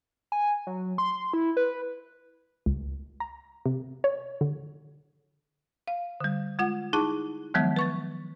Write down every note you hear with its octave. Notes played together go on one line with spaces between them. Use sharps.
G#5
F#3
C6
C6
E4
B4
C#2
A#5
C3
C#5
D3
F5
D3 G3
G#3 F4 F#5
D#4 E4 G#4 A5
D#3 F3 F#3 G#3 B3
B4 C#6 A6